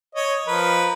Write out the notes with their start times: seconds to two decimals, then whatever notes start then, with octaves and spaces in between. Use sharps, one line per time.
0.15 C#5 D#5
0.47 F3 A#4 B4